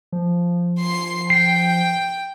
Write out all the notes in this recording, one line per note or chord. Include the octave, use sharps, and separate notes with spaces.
F3
C6 C7
G5 C7